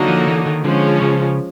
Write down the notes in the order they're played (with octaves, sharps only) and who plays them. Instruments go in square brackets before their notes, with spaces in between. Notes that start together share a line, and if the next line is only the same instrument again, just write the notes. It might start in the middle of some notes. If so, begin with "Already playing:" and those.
Already playing: [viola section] D3 F#3 A#3 D#4
[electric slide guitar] F3
E3
D#3
[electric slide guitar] D3 [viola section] F3 G#3 C#4
[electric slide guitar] C#3